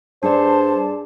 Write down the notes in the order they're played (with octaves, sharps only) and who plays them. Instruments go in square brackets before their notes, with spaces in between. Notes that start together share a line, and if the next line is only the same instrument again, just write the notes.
[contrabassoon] G2 [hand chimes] D4 G#4 D5 [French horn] C5 [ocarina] A5